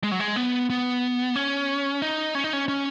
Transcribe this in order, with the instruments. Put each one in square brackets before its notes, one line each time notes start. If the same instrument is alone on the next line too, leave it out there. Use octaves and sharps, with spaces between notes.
[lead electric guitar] G#3
F#3
G#3
B3
B3
C#4
D#4
C#4
D#4
C#4
C#4